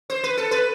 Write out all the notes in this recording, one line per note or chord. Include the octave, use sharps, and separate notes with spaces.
C5
B4
A4
B4